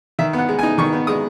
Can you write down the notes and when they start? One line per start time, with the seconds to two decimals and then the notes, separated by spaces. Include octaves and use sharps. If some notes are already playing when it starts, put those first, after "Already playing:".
0.19 D#3 E5
0.33 B3
0.38 F#5
0.49 G#3
0.59 G#5
0.63 D#4
0.78 D#3 C#6
0.93 B3
1.07 G#3 D#6